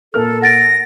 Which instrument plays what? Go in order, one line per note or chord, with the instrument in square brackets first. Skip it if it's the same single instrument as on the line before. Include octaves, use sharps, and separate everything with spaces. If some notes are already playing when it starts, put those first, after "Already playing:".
[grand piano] A#2 A#4 F6 [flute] A4
[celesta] F#5 A6 D7 [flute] A#6